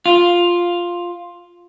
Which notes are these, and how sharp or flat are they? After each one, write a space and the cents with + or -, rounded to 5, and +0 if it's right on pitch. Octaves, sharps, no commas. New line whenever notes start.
F4 +5